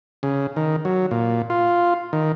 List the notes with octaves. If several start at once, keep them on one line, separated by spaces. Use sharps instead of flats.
C#3
D#3
F#3
A#2
F4
D#3